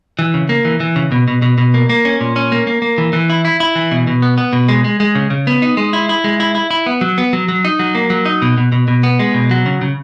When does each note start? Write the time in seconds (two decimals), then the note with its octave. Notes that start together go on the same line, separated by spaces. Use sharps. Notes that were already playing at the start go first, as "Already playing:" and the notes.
0.19 E3
0.34 C#3
0.49 A#3
0.65 E3
0.80 E3
0.96 C#3
1.12 B2
1.28 B2
1.42 B2
1.58 B2
1.74 A#3
1.89 A#3
2.05 C#4
2.21 A#2
2.36 C#4
2.52 A#3
2.67 A#3
2.82 A#3
2.98 E3
3.13 E3
3.30 E4
3.45 E4
3.60 E4
3.75 E3
3.91 B2
4.07 B2
4.22 B3
4.38 B3
4.53 B2
4.68 G#3
4.84 G#3
5.00 G#3
5.15 C#3
5.30 C#3
5.47 B3
5.62 D#4
5.77 G#3
5.93 E4
6.09 E4
6.24 G#3
6.40 E4
6.55 E4
6.71 E4
6.86 B3
7.01 F#3
7.18 B3
7.33 F#3
7.48 F#3
7.65 D#4
7.79 F#3
7.95 A#3
8.10 F#3
8.26 D#4
8.42 B2
8.57 B2
8.72 B2
8.88 B2
9.03 B3
9.19 G#3
9.34 B2
9.51 F#3
9.66 C#3
9.81 C#3